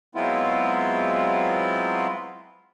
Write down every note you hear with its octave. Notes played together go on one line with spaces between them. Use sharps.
F#3 G#3 B3 C4 E4 F4